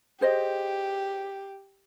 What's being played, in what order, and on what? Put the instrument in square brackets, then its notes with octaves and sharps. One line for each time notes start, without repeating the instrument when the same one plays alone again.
[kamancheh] G4 [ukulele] G#4 C5 D#5